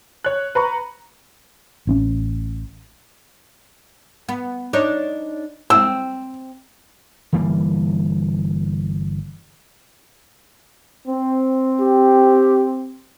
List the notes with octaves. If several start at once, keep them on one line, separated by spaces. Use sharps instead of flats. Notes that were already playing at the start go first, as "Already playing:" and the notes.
C#5 F#6
B4 A#5 C#6
A1 C4 C#4
B3
D4 D#4 C#5
C4 E6
G1 E3 G3 A#3
C4
G4